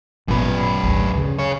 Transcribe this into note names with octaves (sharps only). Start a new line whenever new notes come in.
G#1 F#2 A#2 B3 B4
G#1 D2
C#3
G#4 C#5